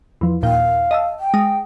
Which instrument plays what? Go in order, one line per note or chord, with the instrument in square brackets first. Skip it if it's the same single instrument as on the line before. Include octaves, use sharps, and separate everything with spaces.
[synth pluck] E2 F3
[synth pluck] D#2 A#2 G5 [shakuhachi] F5
[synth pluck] D#5 A5 E6
[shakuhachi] G5
[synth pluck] G#3 D#6 A#6